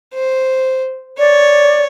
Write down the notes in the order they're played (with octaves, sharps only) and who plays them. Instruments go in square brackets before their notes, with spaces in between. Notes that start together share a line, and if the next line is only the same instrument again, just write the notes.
[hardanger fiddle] C5
[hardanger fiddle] C#5 [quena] D5